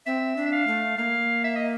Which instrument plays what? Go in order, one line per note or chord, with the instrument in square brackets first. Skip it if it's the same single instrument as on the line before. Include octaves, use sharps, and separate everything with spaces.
[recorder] C4 [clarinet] E5
[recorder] D4
[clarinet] E5
F5
[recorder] A3
[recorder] A#3 [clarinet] F5
[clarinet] E5
D#5